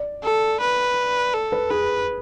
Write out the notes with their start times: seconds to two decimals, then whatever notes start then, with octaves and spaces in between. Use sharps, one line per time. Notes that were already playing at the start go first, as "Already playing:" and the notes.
Already playing: D5
0.23 A4
0.60 B4
1.34 A4
1.52 B4
1.71 G#4 B4